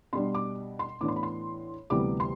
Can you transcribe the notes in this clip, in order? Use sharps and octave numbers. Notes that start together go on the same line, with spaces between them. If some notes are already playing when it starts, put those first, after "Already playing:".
B2 G3 D4 C6
D6
C6
A2 E3 B3 D4 D6
C6
B5
C6
D2 C3 E3 G3 B3 D6
C6